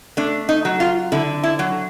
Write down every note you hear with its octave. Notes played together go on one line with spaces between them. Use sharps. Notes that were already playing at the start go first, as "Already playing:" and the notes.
A3 D4
D#4
F#3
F4
D3 E4
E4
F#3